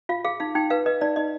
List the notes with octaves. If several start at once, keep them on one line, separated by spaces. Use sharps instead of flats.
F4 F5
G#4 F5
D#4 F5
D#4 G5
B4 F5
B4 D#5
D#4 D5
D#4 D#5